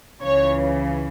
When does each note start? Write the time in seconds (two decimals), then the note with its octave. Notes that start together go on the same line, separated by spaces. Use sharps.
0.23 C#2 C#3 E3 C#5